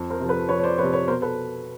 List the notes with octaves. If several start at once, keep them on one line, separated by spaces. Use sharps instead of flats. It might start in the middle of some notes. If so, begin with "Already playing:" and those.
Already playing: F2
A#4 C5
C3 F3
A4 B4
F2 B4 C#5
C#5
C5 D5
F3 B4 C#5
C3
B4 C#5
B2 A#4 C5
A4 B4